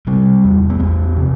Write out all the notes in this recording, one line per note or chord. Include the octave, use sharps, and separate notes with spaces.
C3 G3
E2
B3
E2 A3
C3